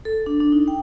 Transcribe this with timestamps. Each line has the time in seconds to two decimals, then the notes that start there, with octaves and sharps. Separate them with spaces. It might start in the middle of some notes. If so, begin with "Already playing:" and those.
0.05 A4
0.26 D4
0.40 D4
0.52 D#4
0.68 G5